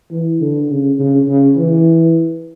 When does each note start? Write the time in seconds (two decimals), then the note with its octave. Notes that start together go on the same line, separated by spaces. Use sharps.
0.11 E3
0.41 D3
0.70 C#3
0.99 C#3
1.28 C#3
1.57 E3